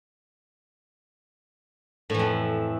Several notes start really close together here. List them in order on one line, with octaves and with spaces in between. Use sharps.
A2 E3 F2